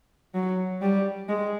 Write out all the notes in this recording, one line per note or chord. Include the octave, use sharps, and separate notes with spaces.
F#3
G3
G#3